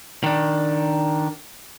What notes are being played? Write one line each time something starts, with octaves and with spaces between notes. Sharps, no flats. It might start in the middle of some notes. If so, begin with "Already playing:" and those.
D#3 D4